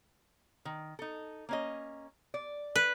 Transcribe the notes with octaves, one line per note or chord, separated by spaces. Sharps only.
D#3
D#4 A4
A#3 C#4 D#5
D5
B4